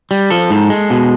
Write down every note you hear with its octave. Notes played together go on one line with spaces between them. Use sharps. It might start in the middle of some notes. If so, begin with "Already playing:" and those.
G3
F3 A4
G#2
G#3
B2